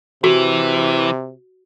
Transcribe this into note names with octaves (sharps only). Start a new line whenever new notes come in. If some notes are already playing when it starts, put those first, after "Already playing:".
C3 E3 F#4